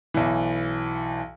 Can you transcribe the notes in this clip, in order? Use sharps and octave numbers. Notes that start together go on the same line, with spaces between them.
B1 E3